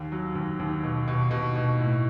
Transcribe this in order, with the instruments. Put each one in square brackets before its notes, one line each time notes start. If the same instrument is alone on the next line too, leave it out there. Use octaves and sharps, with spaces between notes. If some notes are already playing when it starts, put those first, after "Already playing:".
Already playing: [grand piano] D#2
F#3
D#2
D#2
B2
B2
B2
B2
A2